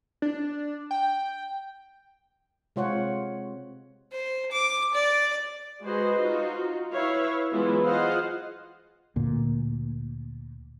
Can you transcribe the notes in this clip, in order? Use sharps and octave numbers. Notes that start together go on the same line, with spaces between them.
D4
G5
C3 G#3 F4 C5 C#5 F#5
C5
D6
D5
G#3 F#4 G#4 B4 C5 D#5
D#4 F4 F#4
E4 B4 C#5 E5 F5
E3 F#3 G#3 B3 E4 F4
F4 G#4 C5 D#5 F5 F#5
D2 A#2